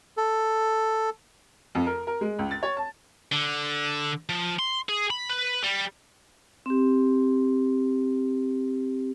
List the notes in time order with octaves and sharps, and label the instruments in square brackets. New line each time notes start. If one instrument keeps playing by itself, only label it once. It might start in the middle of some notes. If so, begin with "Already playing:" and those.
[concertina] A4
[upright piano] F2
A#4
A#4
G#3
C#2
A6
C#5
A5
[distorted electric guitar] D3
F3
C6
G#4
B5
B4
G3
[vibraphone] C4 G4